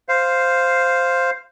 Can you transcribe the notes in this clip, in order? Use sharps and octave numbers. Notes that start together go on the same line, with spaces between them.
C5 F5